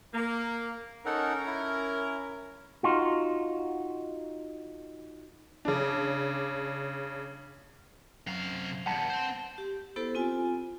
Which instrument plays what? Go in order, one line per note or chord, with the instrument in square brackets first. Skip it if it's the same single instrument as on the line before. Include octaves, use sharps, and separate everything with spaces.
[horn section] A#3
[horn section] C#4 A#4 [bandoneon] D#4 A4 F#5
[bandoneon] E4
[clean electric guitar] D#4 F4 F#4
[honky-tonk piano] C#3 D4
[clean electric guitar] F#2 [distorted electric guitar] C3 F5
[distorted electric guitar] E2 G2 [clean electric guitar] F#5 A5
[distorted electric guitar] C4 C5
[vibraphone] G4
B3 E4 G4 A4 C5
C4 F4 G#5